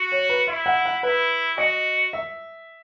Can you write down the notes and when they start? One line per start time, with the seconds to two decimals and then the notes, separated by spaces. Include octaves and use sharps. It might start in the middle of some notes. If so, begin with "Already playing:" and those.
Already playing: F#4
0.12 C#5
0.29 B4
0.47 E4 E5
0.66 F#5
0.85 F#5
1.03 E4 B4
1.58 F#4 D#5
2.13 E5